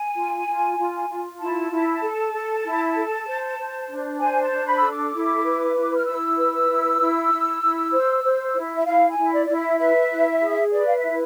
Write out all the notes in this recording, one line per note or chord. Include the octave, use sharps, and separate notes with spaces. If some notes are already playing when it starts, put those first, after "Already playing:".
Already playing: G#5
F4
F4
F4
F4
E4 A5
E4
A4
A4
E4
A4
C5
C5
D4
C5 G#5
A5
D4
B5
A4 E6
D6
E4
B4
E4
F6
E4 E6
B4
E4
E4
E4
E4
C5
C5
E4
E5
E4 F5
G#5
E4
D5
E4 D5
E5
B4 E5
E4
G#4
B4 D5
F5
E5
E4